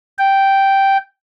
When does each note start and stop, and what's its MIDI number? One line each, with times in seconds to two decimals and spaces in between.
0.18 0.97 79